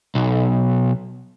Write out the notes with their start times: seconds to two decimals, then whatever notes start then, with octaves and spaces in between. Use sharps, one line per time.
0.15 B1